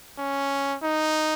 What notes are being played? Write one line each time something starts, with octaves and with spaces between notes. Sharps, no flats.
C#4
D#4